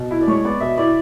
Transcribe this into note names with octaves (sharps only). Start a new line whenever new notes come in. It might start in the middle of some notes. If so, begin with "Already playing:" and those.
Already playing: B2
E4
D5
G#3 C#5
B3 D5
B2 E5
E4 D5